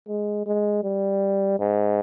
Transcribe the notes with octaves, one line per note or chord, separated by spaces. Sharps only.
G#3
G#3
G3
G#2